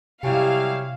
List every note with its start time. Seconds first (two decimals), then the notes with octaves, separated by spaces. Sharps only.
0.23 C3 F#3 G3 E4 G4 F5 G5 G#5